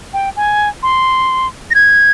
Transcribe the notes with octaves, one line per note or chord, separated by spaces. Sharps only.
G5
G#5
C6
A#6
G#6